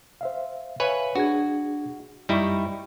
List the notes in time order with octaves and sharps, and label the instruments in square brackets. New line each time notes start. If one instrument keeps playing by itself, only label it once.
[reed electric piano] C5 E5 F5
[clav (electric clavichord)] B4 C#5 G#5 [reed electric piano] E5 F5
[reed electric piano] D4 G#4 G#6 [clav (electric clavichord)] F#4
[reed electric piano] F#2 C#6 [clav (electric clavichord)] G3 D#4 E4